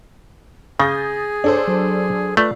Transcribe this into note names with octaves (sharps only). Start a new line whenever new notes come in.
C#3 G#4 D#6 G6 A6 A#6
D4 A4 C5 C#5
F#3
A3 F4 B4 D5